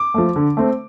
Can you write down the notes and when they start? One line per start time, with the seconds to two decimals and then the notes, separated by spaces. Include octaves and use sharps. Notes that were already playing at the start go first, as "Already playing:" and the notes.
Already playing: D6
0.14 F3 A3
0.36 D3
0.57 A3 C4